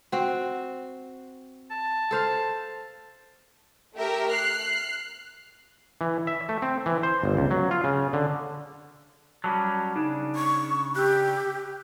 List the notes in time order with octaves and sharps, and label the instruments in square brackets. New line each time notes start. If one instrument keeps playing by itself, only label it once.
[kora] C4 F#4
[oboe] A5
[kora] A4 C5 F5
[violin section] A3 G4 A#4 E5
F6 F#6 C7
[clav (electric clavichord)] E3
E5
A3
C4
E3
C5
G1
C#2
F#3
F4
C#3
D3
[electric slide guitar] F#3 G3 C#4 [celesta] A5
[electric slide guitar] C#3 D4 [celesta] D#4
[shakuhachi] C#6
[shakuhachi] G4 [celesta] E6 F#6